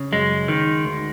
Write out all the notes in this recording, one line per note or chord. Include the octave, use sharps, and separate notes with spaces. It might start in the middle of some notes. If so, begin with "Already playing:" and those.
Already playing: C#3
F#2 G#3
D#3
D2